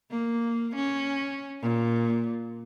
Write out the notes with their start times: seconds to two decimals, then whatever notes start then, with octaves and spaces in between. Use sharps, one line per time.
0.11 A#3
0.75 C#4
1.61 A#2